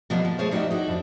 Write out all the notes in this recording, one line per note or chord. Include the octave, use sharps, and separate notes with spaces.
B2 F3 G3 A#3 B3
F3
F3 A3 G#4 C5 C#5 E5
G3 D#4 F#4 G4 D#5 E5
D#4 E4 F#4
F2 D4